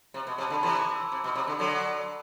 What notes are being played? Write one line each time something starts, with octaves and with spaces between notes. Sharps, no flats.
C3
B2
C3
A5
D3
B5
C3 E3 C6
D6
E6
C3 D6
B2
C3
D3
D3 F#3